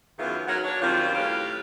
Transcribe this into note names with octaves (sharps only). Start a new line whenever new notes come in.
F#2 D#3 E3 B3 F4 G#4
F#3 D#4 A#4 C#5 F#5
D4 C#5
F#2 D#3 G3 C4 F4
A2 G4 B4 F5